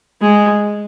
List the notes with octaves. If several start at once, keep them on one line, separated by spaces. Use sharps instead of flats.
G#3